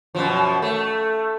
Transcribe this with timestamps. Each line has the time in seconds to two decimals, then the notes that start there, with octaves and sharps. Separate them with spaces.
0.15 F#2 B2 F3
0.62 A3